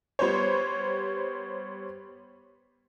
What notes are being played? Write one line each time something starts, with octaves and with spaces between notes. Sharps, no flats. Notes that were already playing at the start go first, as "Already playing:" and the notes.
G3 B3 C5 C#5